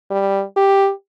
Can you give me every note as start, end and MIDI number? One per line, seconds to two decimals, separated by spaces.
0.10 0.43 55
0.57 0.91 67